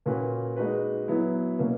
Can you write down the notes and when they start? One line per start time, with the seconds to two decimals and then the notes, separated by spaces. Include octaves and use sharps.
0.06 A#2 A#3 C#4 F#4 B4
0.56 G#3 D#4 F#4 B4
1.08 F#3 B3 E4
1.59 B2 A#3 C#4